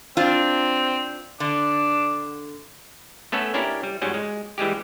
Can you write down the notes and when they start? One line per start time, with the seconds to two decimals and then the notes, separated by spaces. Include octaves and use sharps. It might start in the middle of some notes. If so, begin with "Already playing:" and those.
0.17 C4 D4 F4
1.40 D3 D4
3.32 A3 B3 C#4 A4
3.54 C#4 D4 E4 G4 A#4
3.83 G3
4.02 G#2 F#3 G3 C#4
4.14 G#3
4.58 E3 G3 G#3 G4